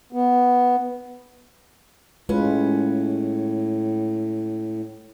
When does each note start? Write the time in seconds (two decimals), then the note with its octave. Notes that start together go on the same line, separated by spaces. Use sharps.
0.13 B3
2.29 A2 G#3 C#4 F4 B4